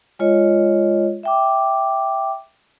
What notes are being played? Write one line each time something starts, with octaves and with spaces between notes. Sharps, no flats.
G#3 F4 C#5 D#5
E5 G5 D6